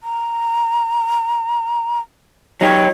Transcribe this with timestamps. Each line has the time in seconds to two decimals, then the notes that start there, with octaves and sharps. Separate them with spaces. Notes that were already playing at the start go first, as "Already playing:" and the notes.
0.03 A#5
2.61 F#3 D#4 G4 C#5